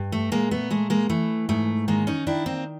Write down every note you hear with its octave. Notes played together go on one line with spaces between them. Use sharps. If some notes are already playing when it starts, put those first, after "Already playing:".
Already playing: G2
A3
A#2 G#3 A#3
A3 B3
G#3 A3
G#3 A#3
E3 A3
G#2 A3
D#3 G#3 A#3
C#4 D#4
D#3 D4 E4
A#3 C4